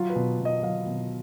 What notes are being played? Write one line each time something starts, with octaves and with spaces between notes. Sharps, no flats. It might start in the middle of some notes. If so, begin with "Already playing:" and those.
Already playing: F#3 F4
B4
B2
B2
D#5
F#3 F5
B2